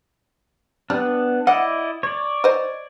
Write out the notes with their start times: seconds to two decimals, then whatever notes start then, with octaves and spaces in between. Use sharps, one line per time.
0.90 G3 B3 D4
1.47 E4 D5 D#5 F#5
2.03 C#5 D5
2.44 C5 D#5